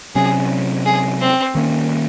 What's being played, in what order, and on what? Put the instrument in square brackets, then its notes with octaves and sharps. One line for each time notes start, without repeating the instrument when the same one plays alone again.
[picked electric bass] C3 F#3 C#4 [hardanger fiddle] G#4
[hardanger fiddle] G#4
C4
[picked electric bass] D#3 A#3 C#4